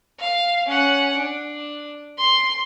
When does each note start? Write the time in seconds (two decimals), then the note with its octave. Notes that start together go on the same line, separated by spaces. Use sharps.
0.20 F5
0.67 C#4 F#5
1.17 D4
2.18 C6